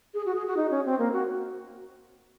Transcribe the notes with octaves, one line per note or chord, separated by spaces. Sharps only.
G#4
F#4
G#4
F#4
D#4
C#4
C4
A#3
F#4